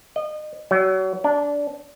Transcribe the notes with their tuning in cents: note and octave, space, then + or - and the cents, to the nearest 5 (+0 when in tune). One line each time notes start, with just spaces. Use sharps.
D#5 -30
F#3 +30
D4 -15